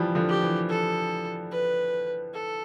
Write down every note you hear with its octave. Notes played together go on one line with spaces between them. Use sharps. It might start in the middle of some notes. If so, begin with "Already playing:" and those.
Already playing: E3 F3 G3
D3 F3
G4
E3
A4
B4
A4